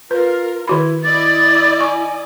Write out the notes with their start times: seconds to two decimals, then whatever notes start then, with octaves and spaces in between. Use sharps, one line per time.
0.11 F4 A#4 B4
0.68 D#3 E4 F#4 B5
1.03 E4 D5 D#5 A6
1.81 G#5 C#6